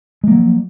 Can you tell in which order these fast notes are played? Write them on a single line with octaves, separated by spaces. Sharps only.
G#3 A#3 F#3 F3